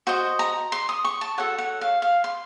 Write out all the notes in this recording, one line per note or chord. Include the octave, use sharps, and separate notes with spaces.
F#4 C5 D#5
A#5
C6
D#6
C#6
A5
F#4 A4 C#5 F#5
F#5
F5
F5
C6